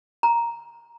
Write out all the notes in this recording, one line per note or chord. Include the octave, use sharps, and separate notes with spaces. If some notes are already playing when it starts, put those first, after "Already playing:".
A#5